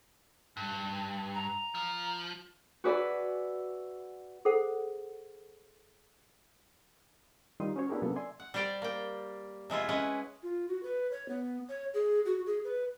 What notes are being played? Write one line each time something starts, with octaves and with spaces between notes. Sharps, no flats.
G2
A#5
F3
F#4 G#4 B4 D5 E5 B5
G#4 A4 C5 F#5
D#3 G3 D#4 F4 C6 D#6
C#4 F#4 C5 C#5
B3 D4 E4 G4 G#4 A#4
C3 F#3 A#3 B3 C#4 A4
D5 E5 G#5 C6
F#5
G3 G4 C5 D5 G5
A#3 G5
C3 G#3 E4 F4
G#3 C#4 B4 F#5
F4
F#4
B4
C#5
B3
C#5
G#4
F#4
G#4
B4